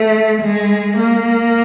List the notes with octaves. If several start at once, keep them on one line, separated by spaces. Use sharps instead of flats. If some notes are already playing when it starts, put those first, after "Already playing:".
Already playing: A3
G#3
A#3